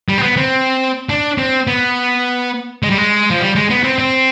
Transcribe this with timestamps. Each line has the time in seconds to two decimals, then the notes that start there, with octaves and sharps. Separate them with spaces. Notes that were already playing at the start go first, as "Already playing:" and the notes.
0.09 G3
0.18 C4
0.23 B3
0.37 C4
1.09 D4
1.38 C4
1.67 B3
2.83 G#3
2.90 G3
2.98 G#3
3.31 F3
3.41 G3
3.55 G#3
3.70 B3
3.84 C4
3.99 C4